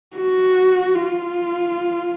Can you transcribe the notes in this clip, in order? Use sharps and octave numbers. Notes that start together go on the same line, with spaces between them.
F#4
F4